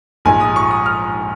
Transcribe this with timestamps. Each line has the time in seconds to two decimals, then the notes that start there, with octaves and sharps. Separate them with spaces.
0.25 A#1 G#2 F3 G#3 G#5
0.40 D#6
0.56 C#6
0.71 D#6
0.86 F6